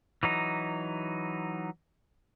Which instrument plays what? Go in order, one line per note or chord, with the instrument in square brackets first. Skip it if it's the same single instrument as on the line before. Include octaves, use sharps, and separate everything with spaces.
[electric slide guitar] E3 F#3 D#4